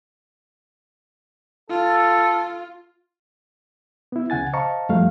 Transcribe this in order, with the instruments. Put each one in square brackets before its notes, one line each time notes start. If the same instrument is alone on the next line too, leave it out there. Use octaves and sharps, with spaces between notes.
[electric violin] F4 [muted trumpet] A4
[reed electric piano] B3 E4
C#2 C#3 F#5 G#5 A6
C5 D#5 F5 A5 A#5 C#6
F#2 F3 G3 A3 F5